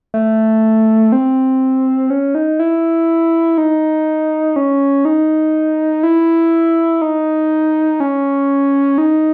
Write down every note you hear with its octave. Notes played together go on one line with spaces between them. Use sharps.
A3
C4
C#4
D#4
E4
D#4
C#4
D#4
E4
D#4
C#4
D#4